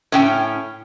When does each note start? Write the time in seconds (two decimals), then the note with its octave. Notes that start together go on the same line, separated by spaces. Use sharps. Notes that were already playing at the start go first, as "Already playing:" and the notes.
0.12 A2 C#4 G5